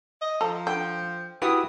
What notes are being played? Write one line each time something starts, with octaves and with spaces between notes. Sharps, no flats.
D#5
F3 A4 A#5
D3 G5
E4 F#4 G4 B4 D#6